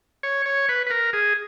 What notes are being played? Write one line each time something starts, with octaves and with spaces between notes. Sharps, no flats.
C#5
C#5
B4
B4
A#4
G#4